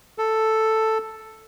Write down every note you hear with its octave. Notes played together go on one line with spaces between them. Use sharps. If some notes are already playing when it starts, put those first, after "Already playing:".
A4